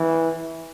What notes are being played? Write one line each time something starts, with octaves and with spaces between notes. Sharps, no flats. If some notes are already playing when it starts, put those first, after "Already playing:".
Already playing: E3